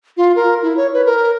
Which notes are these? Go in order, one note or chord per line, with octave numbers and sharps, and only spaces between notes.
F4
A#4
E4
C#5
B4
A#4